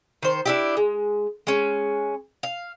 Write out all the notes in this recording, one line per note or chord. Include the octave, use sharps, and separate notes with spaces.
D#3 C5
D4 E4 G4
G#3
G#3 C#4
F5